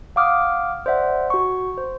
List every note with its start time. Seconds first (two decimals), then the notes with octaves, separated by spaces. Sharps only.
0.16 F5 F#5 D6 D#6 F6
0.86 C5 D5 E5 F#5
1.30 F#4 C#6
1.77 C5